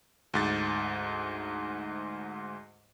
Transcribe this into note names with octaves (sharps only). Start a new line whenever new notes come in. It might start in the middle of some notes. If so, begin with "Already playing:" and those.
D2 G#2 A6